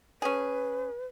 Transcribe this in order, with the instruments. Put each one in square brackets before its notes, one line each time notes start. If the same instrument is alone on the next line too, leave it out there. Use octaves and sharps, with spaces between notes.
[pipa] C#4 G#4 [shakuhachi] B4